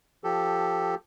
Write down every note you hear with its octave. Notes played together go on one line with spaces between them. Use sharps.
F3 G4 A4